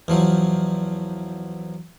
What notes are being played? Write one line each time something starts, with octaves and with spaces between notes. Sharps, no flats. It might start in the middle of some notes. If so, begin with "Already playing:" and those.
E2 F3 F#3